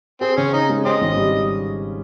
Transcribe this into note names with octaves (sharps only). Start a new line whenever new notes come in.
C4 G#4
C#3 C#4
C#4 D#4
G#3
C#4 G4 C5 D#5
G#1
G3